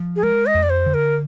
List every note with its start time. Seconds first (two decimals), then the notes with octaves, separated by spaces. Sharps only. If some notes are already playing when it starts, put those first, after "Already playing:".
Already playing: F3
0.16 G#4
0.23 G#3 A#4
0.46 D#5
0.54 F2
0.63 D5
0.70 C5
0.86 D3
0.94 A#4